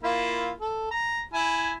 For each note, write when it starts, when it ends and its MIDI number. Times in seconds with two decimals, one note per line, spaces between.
0.03 0.50 58
0.03 0.50 64
0.03 0.50 65
0.60 0.90 69
0.91 1.22 82
1.33 1.73 64
1.33 1.73 80